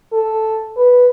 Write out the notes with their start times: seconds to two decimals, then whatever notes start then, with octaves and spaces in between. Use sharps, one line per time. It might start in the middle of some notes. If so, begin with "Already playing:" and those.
0.13 A4
0.77 B4